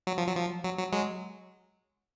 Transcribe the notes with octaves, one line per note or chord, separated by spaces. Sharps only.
F#3
F3
F#3
F3
F#3
F#3
F#3 G#3